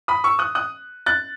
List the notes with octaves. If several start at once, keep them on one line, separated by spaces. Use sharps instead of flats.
B5 D#6
C#6 E6
D#6 F#6
D#6 F#6
F#6 A6